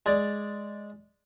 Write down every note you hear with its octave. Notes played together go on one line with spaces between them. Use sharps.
G#3 D5